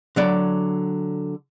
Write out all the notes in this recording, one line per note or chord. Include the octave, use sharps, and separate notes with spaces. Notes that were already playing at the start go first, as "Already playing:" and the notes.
D3 F#3 D5